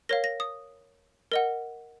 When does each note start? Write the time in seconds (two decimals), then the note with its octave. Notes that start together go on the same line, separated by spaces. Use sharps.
0.09 A#4 C#5 F5 A#6
0.24 A#6
0.40 D#6
1.32 A#4 D#5 F#5